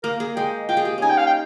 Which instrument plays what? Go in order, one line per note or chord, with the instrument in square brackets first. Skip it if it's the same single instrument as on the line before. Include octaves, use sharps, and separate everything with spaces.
[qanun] A#3 [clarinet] A#4
[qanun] A#3 [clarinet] G#4
[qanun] G#3 [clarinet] G5
[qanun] F4 [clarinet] G5
[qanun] G#4
G4
[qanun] C#4 D#4 [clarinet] G#5
[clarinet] G5
F5
G5